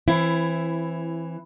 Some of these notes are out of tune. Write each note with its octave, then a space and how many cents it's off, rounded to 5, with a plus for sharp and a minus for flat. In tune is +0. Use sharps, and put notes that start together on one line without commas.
E3 +5 C4 +25 E4 +20